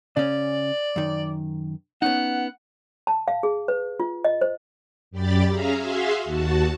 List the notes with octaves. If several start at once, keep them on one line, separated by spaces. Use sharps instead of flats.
C#3 C#4 D5
F#2 D#3
B3 C#4 D#4 F#5
A5
F5
G#4
B4
F4
D#5
C5
F#2 G4 D5 B5 A6
C#4 G#4 E5 F5 A#5
F#4 G#4 E5 F5 C6
D#2 F#4 A5